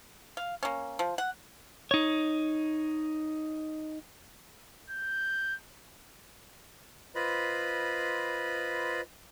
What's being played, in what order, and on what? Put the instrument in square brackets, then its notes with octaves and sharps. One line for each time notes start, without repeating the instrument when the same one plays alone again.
[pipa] F5
A#3 C#4
F3
F#5
[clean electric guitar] D#4 C#5
[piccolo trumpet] G6
[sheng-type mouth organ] F4 B4 C5 D#5 B5